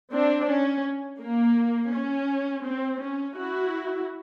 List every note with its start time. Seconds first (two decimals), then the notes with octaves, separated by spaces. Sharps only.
0.12 C4 D4
0.49 C#4
1.21 A#3
1.92 C#4
2.64 C4
3.01 C#4
3.36 E4 F#4